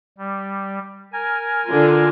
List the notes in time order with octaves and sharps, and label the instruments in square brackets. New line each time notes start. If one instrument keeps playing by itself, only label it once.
[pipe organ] G3
A#4 G#5
[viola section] D3 F4